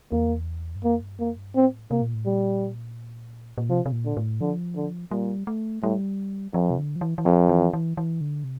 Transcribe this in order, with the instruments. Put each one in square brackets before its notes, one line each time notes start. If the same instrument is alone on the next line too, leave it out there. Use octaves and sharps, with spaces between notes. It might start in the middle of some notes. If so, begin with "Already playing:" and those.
[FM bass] E2 [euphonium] A#3
[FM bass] G2
[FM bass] F2 [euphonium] A#3
[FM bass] G2
[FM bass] F2 [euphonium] A#3
[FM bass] G2
[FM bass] A2 [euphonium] C4
[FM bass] C3 [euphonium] A#3
[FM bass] A#2
A2
[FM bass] A#2 [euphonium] G3
[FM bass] A#2
[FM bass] C3 [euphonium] F3
[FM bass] C3
A#2
[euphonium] D3
[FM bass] A2
[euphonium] D3 [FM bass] F3
[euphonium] D3
[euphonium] A#2 [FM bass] G3
[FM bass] A3
[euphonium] A2 [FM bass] G3
[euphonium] F2 [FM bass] F3
[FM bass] C3
D3
F3
E3
E3
[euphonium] F2 [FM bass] F3
[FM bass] E3
E3
E3
D3
C3